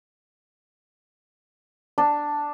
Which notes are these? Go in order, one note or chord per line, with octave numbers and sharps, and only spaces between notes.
D4